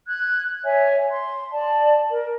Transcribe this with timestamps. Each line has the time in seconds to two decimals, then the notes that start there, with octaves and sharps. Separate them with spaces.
0.08 F#6 G#6
0.64 C#5 E5 G#5
1.11 C6
1.52 D5 A5
2.11 A#4